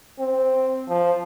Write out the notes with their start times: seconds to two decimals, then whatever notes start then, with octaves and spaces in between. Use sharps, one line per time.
0.19 C4
0.89 F3